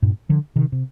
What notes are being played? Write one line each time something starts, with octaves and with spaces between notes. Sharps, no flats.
G2 A#2
D3 F3
C3 D#3
C3